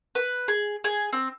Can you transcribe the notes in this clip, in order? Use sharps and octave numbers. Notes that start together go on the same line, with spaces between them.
B4
G#4
G#4
C4